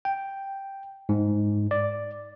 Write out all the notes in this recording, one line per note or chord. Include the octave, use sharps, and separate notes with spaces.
G5
G#2
D5